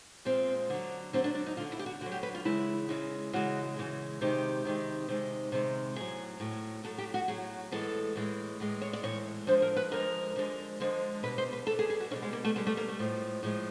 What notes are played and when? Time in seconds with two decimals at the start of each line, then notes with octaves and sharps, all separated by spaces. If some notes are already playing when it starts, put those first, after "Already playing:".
0.25 A#2 F3 G#3 C4
0.70 D3 F#3
1.13 D3 F#3 C4
1.24 D4
1.35 D4
1.46 D#4
1.57 D3 F#3 F4
1.72 E4
1.79 G4
1.86 F#4
2.01 D3 F#4
2.06 F#3
2.12 G4
2.23 B4
2.35 F4
2.45 C#3 E3 G#3 E4
2.89 C#3 E3 G#3
3.33 C#3 E3 G#3 F#4
3.76 C#3 E3 G#3
4.21 C3 D#3 G#3 G4
4.65 C3 D#3 G#3
5.08 C3 D#3 G#3
5.52 C3 D#3 G#3
5.96 A2 F#3 G#4
6.40 A2 F#3
6.84 A2 F#3 A4
6.98 G4
7.14 F#4
7.28 A2 F#3 G#4
7.72 A2 E3 G#3 A4
8.15 A2 E3 G#3
8.60 A2 E3 G#3
8.82 C#5
8.93 D5
9.03 A2 E3 G#3 C#5
9.47 D3 F3 G#3 C5
9.62 A#4
9.76 B4
9.91 D3 F3 G#3 A#4
10.36 D3 F3 G#3
10.80 D3 F3 G#3
11.23 B2 G3 B4
11.38 C5
11.53 B4
11.67 B2 G3 A4
11.79 G#4
11.90 G#4
12.00 F#4
12.11 B2 C#4
12.16 G3
12.22 G#3
12.33 A#3
12.45 A3
12.56 B2 G3 G#3
12.67 A3
12.77 A#3
12.88 A3
12.99 A2 F3 G#3
13.43 A2 F3 G#3